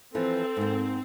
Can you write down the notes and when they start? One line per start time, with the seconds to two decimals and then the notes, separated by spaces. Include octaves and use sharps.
0.15 E3 F3 C4 A4
0.57 G#2 A#3